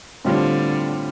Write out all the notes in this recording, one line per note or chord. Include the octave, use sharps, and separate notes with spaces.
A2 D3 G3 C4 F4